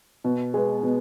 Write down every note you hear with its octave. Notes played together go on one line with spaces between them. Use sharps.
B2
G#3 B3
B2